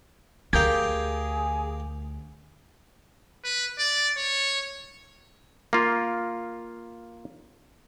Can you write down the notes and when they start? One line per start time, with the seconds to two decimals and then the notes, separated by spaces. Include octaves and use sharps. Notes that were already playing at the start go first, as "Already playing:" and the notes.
0.53 D2 G4 G#4 A#4 F5 G6
3.44 B4
3.78 D5
4.17 C#5
5.73 A#3 F4